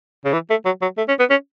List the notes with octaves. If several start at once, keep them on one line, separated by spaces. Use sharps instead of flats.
C#3
E3
A3
F#3
F#3
A3
C#4
B3
C#4